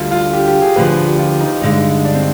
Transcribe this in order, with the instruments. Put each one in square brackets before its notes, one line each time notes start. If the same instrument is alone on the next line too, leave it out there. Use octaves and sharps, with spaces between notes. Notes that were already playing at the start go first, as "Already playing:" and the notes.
Already playing: [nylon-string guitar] D2 D3 G3 D4 [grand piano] F4
[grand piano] F4
G4
G4
G#4
[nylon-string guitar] D2 D3 F3 [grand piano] B4
[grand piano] C5
G4
F4
D#4
[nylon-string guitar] G2 D3 G#3
[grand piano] D4
C4